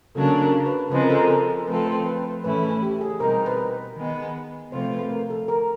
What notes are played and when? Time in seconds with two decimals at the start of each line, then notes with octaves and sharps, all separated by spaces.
0.15 C#3 F#3 A#3 D4 A4
0.41 A#4
0.66 B4
0.91 C#3 F3 G#3 C4 B4
1.01 A#4
1.10 A4
1.18 A#4
1.30 A4
1.68 F3 A3 C4 F4 A4 B4
1.87 C5
2.06 B4
2.25 B4
2.44 A2 E3 A3 C#4 E4 B4
2.63 A4
2.82 G4
3.01 G#4
3.20 B2 G3 C4 D#4 A#4
3.46 B4
3.96 D#3 G#3 B3
4.72 C3 F3 A3 C4 F4 C5
4.92 B4
5.10 A#4
5.30 A4
5.48 A#4